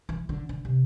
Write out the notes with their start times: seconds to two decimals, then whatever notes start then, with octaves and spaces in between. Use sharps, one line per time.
0.09 E3
0.29 D3
0.49 D3
0.65 C3